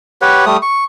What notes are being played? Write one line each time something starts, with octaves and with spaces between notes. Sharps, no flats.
G4 B4 C#5 F#5
G3 A3 D#6
C#6